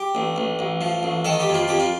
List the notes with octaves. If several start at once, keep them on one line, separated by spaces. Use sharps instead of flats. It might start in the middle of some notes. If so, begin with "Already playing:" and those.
Already playing: G4
A1
A1
A1
F3
A1
D#3 A4
G4
F2
F4
F2 G4
F4